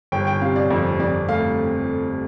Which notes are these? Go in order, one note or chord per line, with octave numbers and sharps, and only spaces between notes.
G1 G5
G5
C3 F5
D5
F2
F2 D5
A3 F5